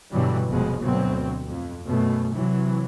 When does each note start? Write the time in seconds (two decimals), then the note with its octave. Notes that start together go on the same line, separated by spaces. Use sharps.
0.12 G2 B2 D3 E3 F#3 G3
0.50 F1 F2 B2 G#3
0.82 D2 G2 B2 F#3 C4
1.47 F2
1.86 F#2 B2 A3
2.33 C3 E3 F#3